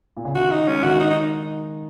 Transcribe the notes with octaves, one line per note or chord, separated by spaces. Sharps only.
A#2
C#3
D#3 F#4
D#4
G#3 C#4
D#3 F#4
D#4
D#4